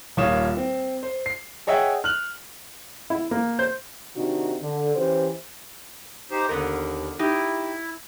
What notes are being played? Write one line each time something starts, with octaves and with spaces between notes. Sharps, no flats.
D#1 A#2 F4 C#5 D#6 E7
C4
C5
C7
G#4 C#5 D#5 E5 F#5 G5
F6 F#6 F#7
E4
A#3
C5
C3 D#3 D4 D#4 F#4
D3
E3 C#4 G4 C5
D#4 G4 C5
D#2 D3 B3 A#4
D#4 E4 G4